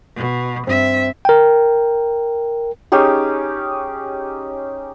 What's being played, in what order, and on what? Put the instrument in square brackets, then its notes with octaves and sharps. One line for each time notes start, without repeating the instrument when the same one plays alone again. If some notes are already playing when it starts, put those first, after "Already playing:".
[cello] B2
[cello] G2 E5 [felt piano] C4
[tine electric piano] A#4 G5
[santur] C#4 D#4 G4 G#4